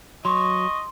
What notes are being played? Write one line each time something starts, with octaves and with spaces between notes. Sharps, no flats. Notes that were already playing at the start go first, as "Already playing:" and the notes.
F#3 D#5 C6 C#6